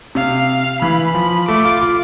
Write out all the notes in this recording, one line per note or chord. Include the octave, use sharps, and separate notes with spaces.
C3 F5
E3 B5
F3 B5
A3 D6
F4
F4